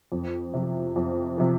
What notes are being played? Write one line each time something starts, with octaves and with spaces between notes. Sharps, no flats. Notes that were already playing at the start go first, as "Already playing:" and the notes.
F2
C3 F3
F2
C3 F3